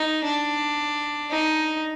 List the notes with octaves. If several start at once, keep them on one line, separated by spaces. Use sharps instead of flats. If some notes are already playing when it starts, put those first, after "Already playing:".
Already playing: D#4
D4
D#4